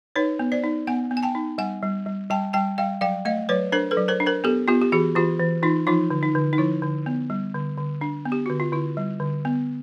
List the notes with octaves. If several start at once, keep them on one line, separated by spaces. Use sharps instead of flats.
D#4 B4 C#5
B3
C5 D5
D#4
B3 F#5 G#5
B3
G#5
G5 A5
D#4
G3 F#5 G#5
G3
G3
G3 G5 A5
G3 G5 A5
G3 F5 G5
F#3 F5 G5
A3 D#5 F5
F#3 B4 C#5
D4 A#4 C5
A4 B4
F#3
A#4 C5
D4
A#4 C5
B3 G4 A4
B3 F4 G4
G4
E3 F#4 G#4
E3 F4 G4
E3
E3 D#4 F4
F3 D#4 F4
D3
D#4
D3
D#4
F3 E4
D3
B3
G3
D3
D3
D4
B3
G4
D3 F#4
F4
D3 E4
G3
D3
B3